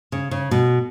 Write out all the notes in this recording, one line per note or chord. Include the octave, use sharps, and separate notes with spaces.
C#3
C#3
B2